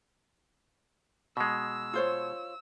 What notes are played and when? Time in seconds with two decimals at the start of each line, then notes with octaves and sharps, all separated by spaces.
1.37 B2 G#3 E6
1.93 F4 C5 C#5